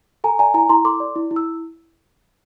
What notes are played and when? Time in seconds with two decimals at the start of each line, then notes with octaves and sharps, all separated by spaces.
0.24 A4 G#5 A#5
0.39 D5 G#5 A#5
0.54 E4 G#5 A#5
0.69 E4 A#5 C6
0.85 A4 C6 D6
1.00 D5
1.16 E4
1.31 E4
1.36 E6